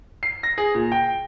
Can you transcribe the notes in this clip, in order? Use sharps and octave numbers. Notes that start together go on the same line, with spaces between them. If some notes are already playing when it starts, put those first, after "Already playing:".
C7
A#6
G#4
A#2
G5